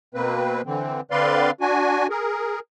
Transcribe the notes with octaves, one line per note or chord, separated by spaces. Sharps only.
B2 A#3 C4 B4
D3 E3 C4
D3 C4 B4 D5 F5 C6
D4 F#4 G#5
G#4 A#4